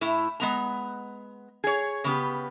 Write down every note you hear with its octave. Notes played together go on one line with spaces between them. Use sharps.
A2 E4
G#3 B3 A#5
G#4 C#5
C#3 B3 G4